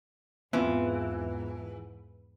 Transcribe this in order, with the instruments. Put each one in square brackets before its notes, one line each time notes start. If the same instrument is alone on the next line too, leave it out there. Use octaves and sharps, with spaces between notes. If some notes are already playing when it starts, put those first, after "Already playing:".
[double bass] E2 G#2 [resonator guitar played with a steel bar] E3 [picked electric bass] B3 [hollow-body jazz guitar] C4 E4 F4